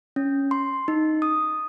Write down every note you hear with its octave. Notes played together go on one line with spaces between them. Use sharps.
C#4
C6
D#4
D#6